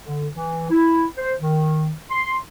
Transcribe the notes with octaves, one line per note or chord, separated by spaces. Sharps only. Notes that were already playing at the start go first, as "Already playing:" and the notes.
D3
E3
E4
C5
D#3
C6